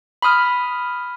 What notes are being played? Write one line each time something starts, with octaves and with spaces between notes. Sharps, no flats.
B5 C6 D#6 F6